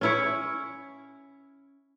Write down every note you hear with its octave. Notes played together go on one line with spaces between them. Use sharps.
C#4 E4 C#5